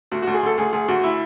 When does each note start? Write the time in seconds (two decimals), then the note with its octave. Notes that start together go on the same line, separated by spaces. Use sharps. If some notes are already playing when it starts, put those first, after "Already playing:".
0.12 D2 F#4
0.22 D2 F#4
0.34 G#4
0.43 D2 A4
0.58 D2 G#4
0.73 D2 G#4
0.88 D2 F#4
1.04 E4